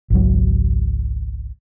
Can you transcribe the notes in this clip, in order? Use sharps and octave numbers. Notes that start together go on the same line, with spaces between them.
G#1 C#2 F#3